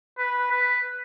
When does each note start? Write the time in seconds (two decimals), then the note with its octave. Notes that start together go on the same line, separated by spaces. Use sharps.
0.18 B4
0.51 B4